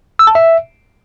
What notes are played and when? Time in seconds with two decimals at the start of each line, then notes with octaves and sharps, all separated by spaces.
0.19 E6
0.27 A5
0.35 E5